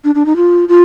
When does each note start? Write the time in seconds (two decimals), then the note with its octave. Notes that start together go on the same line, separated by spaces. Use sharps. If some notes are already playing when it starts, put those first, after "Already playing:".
0.04 D4
0.15 D4
0.26 D#4
0.36 F4
0.69 F4